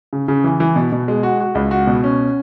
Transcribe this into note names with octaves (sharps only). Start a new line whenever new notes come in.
C#3
C#3
E3
E3
B2
B2
G#3
F#4
F#4
C#2
F#4
B2
C#4